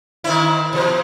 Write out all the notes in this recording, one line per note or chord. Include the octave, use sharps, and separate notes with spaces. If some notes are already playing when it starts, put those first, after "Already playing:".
D#3 C4 E4
B2 F3 C5